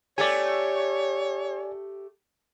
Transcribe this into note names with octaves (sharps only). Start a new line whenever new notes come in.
A3 G4 C#5 D5 G#5